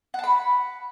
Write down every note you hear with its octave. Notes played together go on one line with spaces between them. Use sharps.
F#5 A5 B5